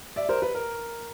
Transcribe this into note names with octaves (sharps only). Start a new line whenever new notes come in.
D5 E5
A#4 C5
B4
A#4